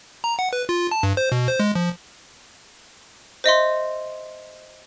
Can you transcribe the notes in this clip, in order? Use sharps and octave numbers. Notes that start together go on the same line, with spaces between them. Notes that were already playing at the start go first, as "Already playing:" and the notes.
A#5
F#5
B4
F4
A5
G2
C5
B2
C5
G#3
F3
C5 D#5 E5 C6